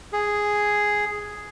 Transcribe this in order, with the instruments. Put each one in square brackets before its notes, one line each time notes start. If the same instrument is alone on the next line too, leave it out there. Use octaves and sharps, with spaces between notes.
[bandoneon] G#4